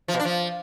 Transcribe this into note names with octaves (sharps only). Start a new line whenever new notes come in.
F3
B2
D4
F3